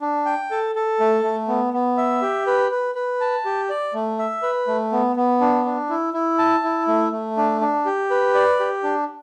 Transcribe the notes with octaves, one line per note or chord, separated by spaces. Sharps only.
D4
G5
A4
A4
A3
A3
B3
B3
E5
G4
B4
B4
B4
A5
G4
D5
A3
E5
B4
A3
B3
B3
D4
D4
E4
E4
A5
E4
A3
A3
D4
D4
G4
B4
D5
G4
D4